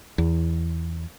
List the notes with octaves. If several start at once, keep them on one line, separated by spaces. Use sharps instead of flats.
E2